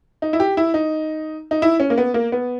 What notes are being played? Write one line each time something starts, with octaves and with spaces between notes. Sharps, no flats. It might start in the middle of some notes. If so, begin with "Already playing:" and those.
D#4
E4
G4
E4
D#4
D#4
E4
C#4
A#3
B3
A#3
B3